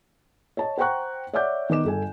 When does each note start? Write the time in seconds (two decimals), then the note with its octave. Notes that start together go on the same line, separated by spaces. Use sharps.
0.57 C#5 D#5 A5
0.78 C5 F#5 G5 A#5 C#6 F#6
1.33 C#5 D5 E5 F#5 D6 G6
1.69 D#3 B3 D#5 D6 E7
1.85 G1 A4 G#5